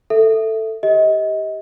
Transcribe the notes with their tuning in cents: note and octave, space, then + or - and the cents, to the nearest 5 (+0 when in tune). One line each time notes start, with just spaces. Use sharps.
A4 +10 E5 +0
G4 +0 D#5 +30